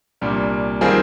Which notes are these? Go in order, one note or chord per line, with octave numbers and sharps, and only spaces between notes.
C2 A#2 G3 D4
D#3 G3 C4 F4 G#4